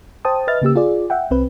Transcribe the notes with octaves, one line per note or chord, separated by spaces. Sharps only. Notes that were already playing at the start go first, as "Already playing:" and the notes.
C5 G5 A5 D#6
B4 D#5 E5 F6 A6
C#3 A#3 G4 E6
F4 G#4 D5
E5 F#5 G5
C2 C4 B4